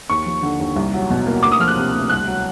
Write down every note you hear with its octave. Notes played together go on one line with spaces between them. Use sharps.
D#2 C#6
F3
D3
D#2
C2
F#3
B2
A#3
D2 D6
D#6
F3 F6
F#6
C3
D2
C2 F#6
F#3